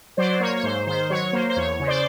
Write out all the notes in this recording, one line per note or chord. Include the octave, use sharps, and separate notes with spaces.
F#3 C5 D5
A#3 C#5
C#5
G#2 C5
D#3 C5
F#3 C#5
A#3 C5
C5
E2 C#5
C#3
C5 D5